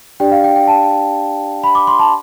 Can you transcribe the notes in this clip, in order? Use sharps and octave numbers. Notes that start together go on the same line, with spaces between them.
D4 G4 D5 G5
F5
G5
G5
A5
B5
D6
C6
A5